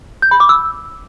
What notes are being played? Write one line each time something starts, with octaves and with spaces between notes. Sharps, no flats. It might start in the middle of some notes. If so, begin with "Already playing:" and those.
G6
B5
D6
E6